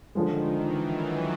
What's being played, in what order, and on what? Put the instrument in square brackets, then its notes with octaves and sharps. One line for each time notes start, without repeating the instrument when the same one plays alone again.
[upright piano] D3 F3 G#3 [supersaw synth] D#3
[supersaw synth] E3
F#3